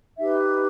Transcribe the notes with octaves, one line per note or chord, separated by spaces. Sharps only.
D#4 G4 B4 E5